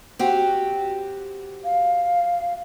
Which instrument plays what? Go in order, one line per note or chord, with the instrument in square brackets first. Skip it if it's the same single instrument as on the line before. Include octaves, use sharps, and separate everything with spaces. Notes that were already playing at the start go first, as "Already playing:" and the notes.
[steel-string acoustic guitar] C4 F#4 G4
[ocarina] F5